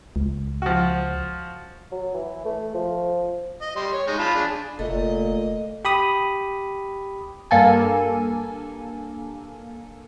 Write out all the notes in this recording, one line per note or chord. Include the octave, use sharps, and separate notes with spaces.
C#2
F3 F#4
F#3
E3
A3
F3
D#5
G3 C6
C#5
G#3 D#4 C#6
F4 A5 B5
D4 G#4
F1 A#2 A3 D#5
G4 B5 D#6
G2 A#3 A4 G#5